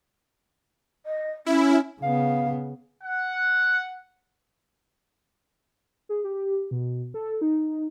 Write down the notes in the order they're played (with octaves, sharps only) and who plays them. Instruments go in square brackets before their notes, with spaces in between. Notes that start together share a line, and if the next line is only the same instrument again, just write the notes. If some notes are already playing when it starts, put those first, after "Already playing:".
[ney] D#5
[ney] C#4 [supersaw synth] E4
[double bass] C#3 B3 [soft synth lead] F5
[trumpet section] F#5
[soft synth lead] G#4
G4
B2
A4
D#4